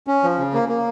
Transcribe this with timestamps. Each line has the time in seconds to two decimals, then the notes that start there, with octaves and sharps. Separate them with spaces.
0.07 C#4
0.23 F3
0.39 C#3
0.54 A#3
0.69 A#3